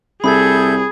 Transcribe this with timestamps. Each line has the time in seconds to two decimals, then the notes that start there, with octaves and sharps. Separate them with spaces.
0.24 C2 G#4 A4 E5 B5 D#6 G6 G#6